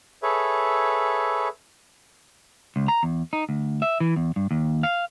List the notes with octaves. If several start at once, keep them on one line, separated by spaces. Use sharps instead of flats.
G#4 A4 B4 C#5 E5
C#2
A#5
E2
D#4
D2
E5
E3
E2
G2
D#2
F5